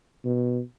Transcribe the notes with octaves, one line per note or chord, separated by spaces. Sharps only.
B2